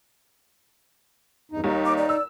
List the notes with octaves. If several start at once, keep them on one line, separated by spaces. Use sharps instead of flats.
E2 G2 D#4
D#2 G3 D#4
D6
D5
D5 E6